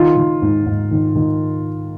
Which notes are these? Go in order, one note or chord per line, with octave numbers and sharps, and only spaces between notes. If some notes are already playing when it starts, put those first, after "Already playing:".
Already playing: D#3 F4
D#3
G#2
G#2
D#3
D#3